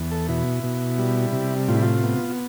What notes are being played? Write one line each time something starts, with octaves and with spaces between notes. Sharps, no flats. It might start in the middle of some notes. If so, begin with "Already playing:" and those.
Already playing: E2
A4
B2 E4
B2
G3
C3
A2 F4
E4
F4
B3